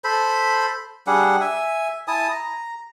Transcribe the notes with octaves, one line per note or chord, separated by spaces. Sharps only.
A4 C5 B5
G3 D4 G#4 F#5
E5 G#5
E4 G#5 A5 D#6
A#5